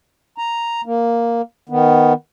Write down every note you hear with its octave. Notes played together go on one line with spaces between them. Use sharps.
A#5
A#3
D#3 B3